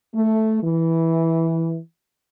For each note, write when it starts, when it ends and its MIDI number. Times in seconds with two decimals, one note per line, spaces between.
0.14 0.62 57
0.63 1.78 52